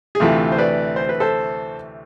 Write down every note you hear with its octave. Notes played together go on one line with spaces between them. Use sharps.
G#4
D2 C3 E3 A3 F4
C5
B4 D5
C5
B4
A4 C5